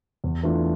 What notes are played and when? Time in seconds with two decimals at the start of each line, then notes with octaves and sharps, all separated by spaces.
0.24 E2
0.43 E3 A3 D4 F4